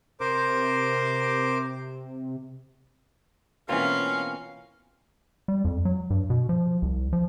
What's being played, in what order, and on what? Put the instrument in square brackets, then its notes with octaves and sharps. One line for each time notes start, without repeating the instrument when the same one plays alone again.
[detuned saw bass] C3 [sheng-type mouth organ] A#4 C5 D6
[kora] B2 E3 [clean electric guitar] A#3 C4 F4 [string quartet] C#4 [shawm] F5
[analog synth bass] G3
F2
F#3
G2
B2
F3
C2
F3